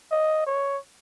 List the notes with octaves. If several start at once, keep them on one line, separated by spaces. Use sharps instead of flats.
D#5
C#5